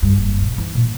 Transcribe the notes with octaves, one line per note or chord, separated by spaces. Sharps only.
G2
F#1
A#2
E3 E4
A#2